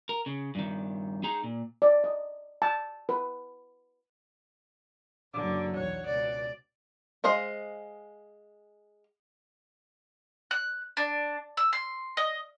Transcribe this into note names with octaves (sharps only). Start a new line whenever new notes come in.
A#4
C#3
G2 D#3
D#4 G#4 A#5
A#2
D5
D#5
A5
B4
F#1 D3 F#3 D6
B1 E2 C#5 F#5
C#2 B2 D5
G#3 C5 D#5 F5
F#6
D4
E6
C6
D#5